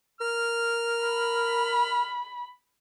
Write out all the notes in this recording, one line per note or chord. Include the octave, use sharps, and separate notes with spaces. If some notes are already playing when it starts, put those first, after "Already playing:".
A#4 F6
B5